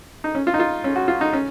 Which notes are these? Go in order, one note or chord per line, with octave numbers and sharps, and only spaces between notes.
D#4
C#4
F4
D#4
F4
C#4
F#4
F4
D#4
C#4